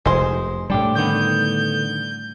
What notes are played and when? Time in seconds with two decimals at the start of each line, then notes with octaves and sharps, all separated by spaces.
0.06 F1 G#3 C5
0.70 A2 G3 D4 G4
0.95 D3 D#3 B3 G6